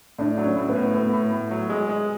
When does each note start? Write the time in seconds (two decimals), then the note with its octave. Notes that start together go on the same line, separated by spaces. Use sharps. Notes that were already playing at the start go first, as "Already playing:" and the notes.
0.19 A2 D4
0.38 F#3
0.44 C#4
0.56 A2
0.69 B3
0.75 A2
0.94 A2 B3
1.13 A2
1.32 A2
1.51 F#3
1.70 G#3
1.89 G#3